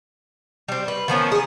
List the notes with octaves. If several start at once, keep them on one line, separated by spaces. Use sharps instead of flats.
G3 C4
B4
D#3 F3 B3 C#4
G#4